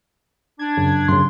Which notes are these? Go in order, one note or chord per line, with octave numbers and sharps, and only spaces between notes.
D4 G#6
F#2 C#3
F#2 C#3 C6